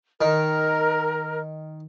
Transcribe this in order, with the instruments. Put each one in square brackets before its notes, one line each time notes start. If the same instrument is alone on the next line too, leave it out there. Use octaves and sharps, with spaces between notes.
[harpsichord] D#3 [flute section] A#4